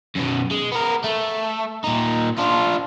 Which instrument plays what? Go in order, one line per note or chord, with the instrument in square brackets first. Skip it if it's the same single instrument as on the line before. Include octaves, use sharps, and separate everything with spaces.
[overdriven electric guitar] F#2 B2
G#3
B3 A#4
A3
A#2 D#4
D4 F4